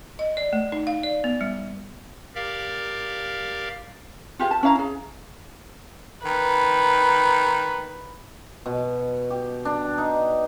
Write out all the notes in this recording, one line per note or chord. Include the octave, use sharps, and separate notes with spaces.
D#5
D5
A3
D#4
F5
D5
B3
G3
G4 A#4 D5 F5
F4 G4 G#4 F5
A5
C#4 E4 F5 A#5
G#4
D#3 B4
B2
G4
D4
D#4